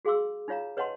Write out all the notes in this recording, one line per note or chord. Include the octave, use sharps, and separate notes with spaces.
F#4 G#4 F5 C6 D6 E6
D#4 F4 C#5 F5 A#5
B4 C#5 D#5 F#5 A5 C6